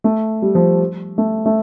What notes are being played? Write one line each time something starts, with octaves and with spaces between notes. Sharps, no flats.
A3
G3
F3
A3
A3